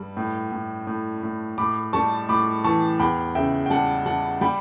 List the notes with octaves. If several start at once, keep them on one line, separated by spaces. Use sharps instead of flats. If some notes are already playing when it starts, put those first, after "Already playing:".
Already playing: G2 G3
A2
A2
A2
A2
A2 B5 D6
G3 A5 C#6
A2 B5 D6
E3 A5 C#6
E2 G5 B5
C#3 E5 G5
G5
G3 F#5 A5
G3 F#5 A5
G3 G5 B5